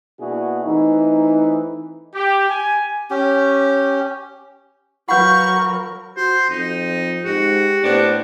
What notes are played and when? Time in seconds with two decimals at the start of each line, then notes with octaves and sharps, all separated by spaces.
0.19 B2 A#3 D4 E4 F#4 G#4
0.64 E3 A3 C4 D#4
2.15 G4
2.49 G#5
3.10 C#4 G4
5.09 F#3 A#4 B4 F5 F#5 B5 C#6 G6
6.17 F#4 C5
6.50 F2 D#4
7.25 G#2 F#4 G4
7.83 A2 B3 C4 D4